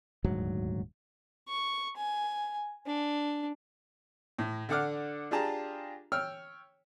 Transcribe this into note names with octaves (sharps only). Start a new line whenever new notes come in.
D#1 D2 G#2 F#3
C#6
G#5
D4
A2
D3 D4 A4 F#5 D6 F6
D4 F4 G4 G#4 A5 A#5
C#5 G5 E6 F6